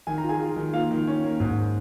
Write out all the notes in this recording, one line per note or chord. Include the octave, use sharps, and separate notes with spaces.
D#3 G#5
A#5
F4
G#4 G#5
F4
D#3
A#3 F4 F5
D#3
C#4
A#3
G#2